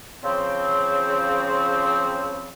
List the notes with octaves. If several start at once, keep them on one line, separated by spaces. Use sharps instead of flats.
C#3 F3 C4